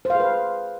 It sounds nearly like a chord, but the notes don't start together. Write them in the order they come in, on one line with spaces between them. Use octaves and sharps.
C5 F5 G#4 B4